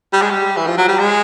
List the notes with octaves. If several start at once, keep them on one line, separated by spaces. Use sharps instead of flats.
G3
G#3
G3
E3
F3
F#3
G3
G#3